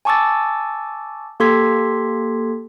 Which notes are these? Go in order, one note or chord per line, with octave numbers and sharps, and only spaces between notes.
G#5 A5 C#6 D6 E6 A6
A#3 G4 A4 C6 G#6 B6